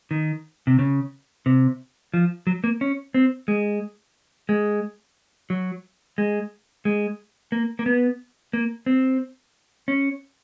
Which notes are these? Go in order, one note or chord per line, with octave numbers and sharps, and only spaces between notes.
D#3
C3
C#3
C3
F3
F#3
A#3
C#4
C4
G#3
G#3
F#3
G#3
G#3
A#3
A#3
B3
A#3
C4
C#4